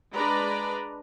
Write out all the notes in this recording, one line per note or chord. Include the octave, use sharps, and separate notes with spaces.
G#3 D4 B4 D5 A#5